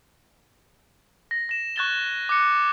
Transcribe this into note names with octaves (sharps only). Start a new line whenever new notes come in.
A#6
A#6 E7
C#6 F#6 G#6 A6 E7 G7
D6 F#6 C#7